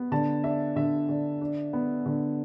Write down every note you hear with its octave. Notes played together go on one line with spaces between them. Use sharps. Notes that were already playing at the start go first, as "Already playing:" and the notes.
Already playing: B3
D3 A5
D4 E5
D3 E5
D3
D4
B3
D3